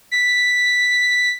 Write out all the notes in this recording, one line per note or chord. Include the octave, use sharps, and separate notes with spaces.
B6